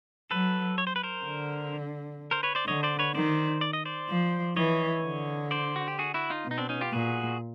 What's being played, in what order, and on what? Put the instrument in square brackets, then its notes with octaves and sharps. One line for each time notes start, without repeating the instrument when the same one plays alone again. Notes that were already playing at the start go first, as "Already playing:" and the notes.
[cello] F#3 [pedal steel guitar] A4 B4
[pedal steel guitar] C#5
C5
B4
A#4 C5
[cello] D3
[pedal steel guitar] A#4 C5
B4 C#5
C5 D5
[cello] D3 [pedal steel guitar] C#5 D#5
[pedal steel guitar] C5 D5
B4 C#5
[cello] D#3 [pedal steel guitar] C5 D5
[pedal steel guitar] D5
D#5
C5 D5
[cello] F3
[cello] E3 [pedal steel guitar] C#5 D#5
[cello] D3
[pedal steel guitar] C5 D5
F#4
G4
F#4 G#4
E4 F#4
D#4 F4
[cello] B2
[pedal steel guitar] D#4
C4 D4
C#4 D#4
F4 G4
[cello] A#2 [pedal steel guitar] F#4 G#4